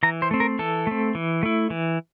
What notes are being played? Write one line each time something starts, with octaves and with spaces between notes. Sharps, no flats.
E3 A#5
C5
A3 C4
A#4
E3 A4
A3 C4
E3
A3 E4
E3